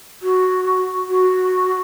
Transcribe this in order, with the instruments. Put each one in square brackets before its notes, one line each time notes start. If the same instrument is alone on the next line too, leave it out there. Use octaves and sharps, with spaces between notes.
[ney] F#4
F#4